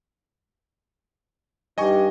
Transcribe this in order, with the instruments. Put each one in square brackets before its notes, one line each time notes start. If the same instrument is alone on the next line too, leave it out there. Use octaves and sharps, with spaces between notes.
[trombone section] G2 D#4 G4 [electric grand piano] D#5 G#5 C#6